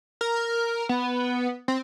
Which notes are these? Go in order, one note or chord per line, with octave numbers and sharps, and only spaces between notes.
A#4
B3
C4